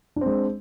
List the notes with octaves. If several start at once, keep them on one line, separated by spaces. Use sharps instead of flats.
G#3 C4 D4